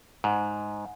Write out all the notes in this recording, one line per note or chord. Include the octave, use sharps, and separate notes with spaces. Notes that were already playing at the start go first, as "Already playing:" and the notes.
G#2